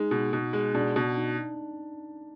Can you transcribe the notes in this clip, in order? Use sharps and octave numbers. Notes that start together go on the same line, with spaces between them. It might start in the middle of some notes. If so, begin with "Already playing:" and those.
Already playing: G#3 D#4
B2
B2
G#3
B2 D4
B2 D4
D#4